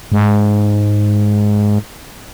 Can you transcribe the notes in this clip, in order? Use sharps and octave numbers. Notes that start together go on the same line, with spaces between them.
G#2